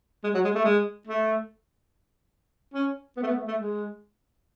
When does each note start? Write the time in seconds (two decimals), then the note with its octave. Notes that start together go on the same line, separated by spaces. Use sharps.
0.24 G#3
0.34 F#3
0.44 G#3
0.55 A3
0.65 G#3
1.07 A3
2.74 C#4
3.17 B3
3.22 A3
3.27 B3
3.36 A3
3.47 A3
3.59 G#3